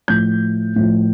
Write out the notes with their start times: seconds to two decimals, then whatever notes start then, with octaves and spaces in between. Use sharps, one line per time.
0.08 A2 F3 G6
0.76 A2 F3